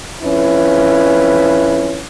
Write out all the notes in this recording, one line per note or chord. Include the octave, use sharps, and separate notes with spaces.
F2 C#4 E4 B4